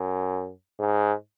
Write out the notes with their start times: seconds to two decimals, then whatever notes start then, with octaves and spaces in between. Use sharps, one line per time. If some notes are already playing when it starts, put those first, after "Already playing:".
Already playing: F#2
0.79 G#2